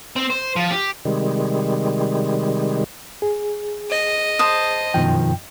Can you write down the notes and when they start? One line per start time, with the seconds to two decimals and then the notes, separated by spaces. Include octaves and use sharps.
0.16 C4
0.30 C5
0.56 F3
0.70 G4
1.05 C3 D#3 G3 G#3
3.22 G#4
3.91 D#5
4.39 C5 A5 D#6
4.94 F#2 B2 D#3 F3 G5